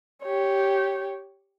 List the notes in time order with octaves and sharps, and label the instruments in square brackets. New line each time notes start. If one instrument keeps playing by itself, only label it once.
[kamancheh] G4 C#5